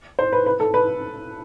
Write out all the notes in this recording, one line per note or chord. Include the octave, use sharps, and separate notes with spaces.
C5
B4
B4
A4
B4